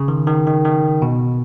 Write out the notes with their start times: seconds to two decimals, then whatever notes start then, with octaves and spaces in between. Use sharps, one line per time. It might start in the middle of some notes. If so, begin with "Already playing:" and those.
Already playing: C#3
0.08 D#3
0.27 D#3
0.47 D#3
0.65 D#3
1.02 B2